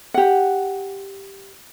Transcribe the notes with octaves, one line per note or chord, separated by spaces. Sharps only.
G4 F#5